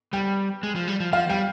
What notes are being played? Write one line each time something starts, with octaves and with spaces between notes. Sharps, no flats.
G3 G5
G#3
F3
G3
F3
F3 F5
G3 G5